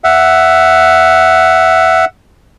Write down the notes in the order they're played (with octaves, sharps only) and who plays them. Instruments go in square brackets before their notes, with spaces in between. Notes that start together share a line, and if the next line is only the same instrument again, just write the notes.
[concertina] E5 F#5